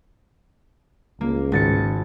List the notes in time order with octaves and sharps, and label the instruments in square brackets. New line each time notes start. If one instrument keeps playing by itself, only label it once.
[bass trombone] C#2 [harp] A#3
[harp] G#1 A6 C#7